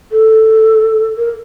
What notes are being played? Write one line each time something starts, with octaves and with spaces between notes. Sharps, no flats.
A4
A#4